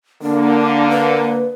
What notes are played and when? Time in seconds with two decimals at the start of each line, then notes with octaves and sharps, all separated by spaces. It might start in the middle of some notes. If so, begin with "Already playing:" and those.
0.22 D3 A#3 D4
0.90 B4